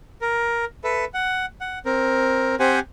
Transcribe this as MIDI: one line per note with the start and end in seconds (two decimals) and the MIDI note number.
0.21 0.65 70
0.84 1.05 69
0.84 1.05 71
0.84 1.05 76
1.14 1.46 78
1.61 1.79 78
1.85 2.55 60
1.85 2.55 70
2.60 2.80 60
2.60 2.80 67
2.60 2.80 72
2.60 2.80 78
2.60 2.80 80